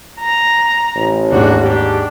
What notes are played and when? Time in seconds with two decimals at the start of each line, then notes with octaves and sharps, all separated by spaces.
0.20 A#5
0.95 A1
1.31 D#2 G#2 D4 F#4
1.63 D4 G4